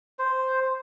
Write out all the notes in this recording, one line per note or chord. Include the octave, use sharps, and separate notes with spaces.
C5